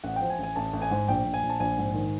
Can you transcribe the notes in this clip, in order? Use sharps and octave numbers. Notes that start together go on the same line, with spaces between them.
A1 F#5
F3 G5
G#5
A1
G#5
A1 A5
A1
G#5
G#2
A#1 G5
A#1
G#5
A#1
A5
A#1 G#5
G#2
D#3